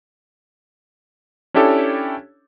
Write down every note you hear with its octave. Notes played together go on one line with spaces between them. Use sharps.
C#4 D4 E4 G4 A4 C#5